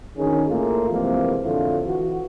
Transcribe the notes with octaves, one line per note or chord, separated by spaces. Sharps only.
D2 D#3 C#4 D#4 G#4
A2 A3 A#3 F4
C3 E3 F3 G#3 A#3 C4
F2 A2 D3 F3 A3 F4
E3 F#4